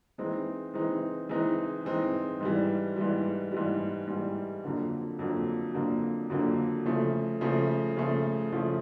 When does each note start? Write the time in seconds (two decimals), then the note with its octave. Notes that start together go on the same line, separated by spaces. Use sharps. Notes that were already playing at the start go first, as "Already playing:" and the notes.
0.18 E3 G#3 C4 D#4
0.74 E3 G#3 C4 D#4
1.29 E3 G#3 C4 D#4
1.85 E3 G#3 C4 D#4
2.41 G#2 E3 G3
2.96 G#2 E3 G3
3.52 G#2 E3 G3
4.07 G#2 E3 G3
4.63 F2 D3 F#3 A#3
5.19 F2 D3 F#3 A#3
5.74 F2 D3 F#3 A#3
6.30 F2 D3 F#3 A#3
6.85 C#3 F3 A3
7.41 C#3 F3 A3
7.97 C#3 F3 A3
8.52 C#3 F3 A3